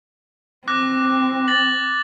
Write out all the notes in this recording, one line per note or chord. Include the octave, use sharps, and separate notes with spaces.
C4 D6 F#6 A#6
A6 A#6 F#7